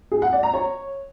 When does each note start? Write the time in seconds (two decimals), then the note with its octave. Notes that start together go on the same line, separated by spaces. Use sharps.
0.12 G#4
0.22 F#5
0.33 D5
0.43 A#5
0.54 C#5